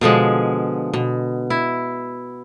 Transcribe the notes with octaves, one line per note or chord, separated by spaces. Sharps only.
B2 D3 F3 G#3
B2
E4